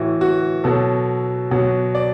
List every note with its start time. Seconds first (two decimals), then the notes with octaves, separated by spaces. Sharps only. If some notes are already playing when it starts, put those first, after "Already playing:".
Already playing: A2 E3 F#4
0.21 F#4
0.64 B2 F#3 A4
1.51 B2 F#3
1.95 D5